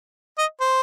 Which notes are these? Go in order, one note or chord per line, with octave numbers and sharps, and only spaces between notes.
D#5
C5